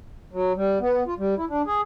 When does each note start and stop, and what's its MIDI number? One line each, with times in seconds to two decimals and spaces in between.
0.33 0.53 54
0.56 0.79 55
0.80 1.03 59
1.07 1.14 65
1.19 1.35 55
1.38 1.45 64
1.49 1.62 62
1.67 1.81 68